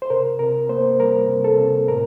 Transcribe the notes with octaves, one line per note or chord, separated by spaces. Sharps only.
C5
C3 A#4
C3 A#4
A#3 C5
G3 A#4
C3
A4
C3
A2 A#4